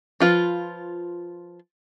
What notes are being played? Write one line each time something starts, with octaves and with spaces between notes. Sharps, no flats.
F3 F4 B4